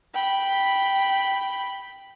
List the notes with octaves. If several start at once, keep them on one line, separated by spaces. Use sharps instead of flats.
G5 B5